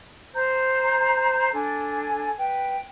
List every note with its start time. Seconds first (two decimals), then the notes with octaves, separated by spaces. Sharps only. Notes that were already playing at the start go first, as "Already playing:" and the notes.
0.33 C5 A#5 G6
1.53 D4 A4 G#5
2.36 B4 G5